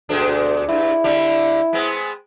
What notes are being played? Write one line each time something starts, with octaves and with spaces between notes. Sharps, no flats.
D2 B2 G#3 D4
G2 E4
D3 G3 D4
G#3 B3 C4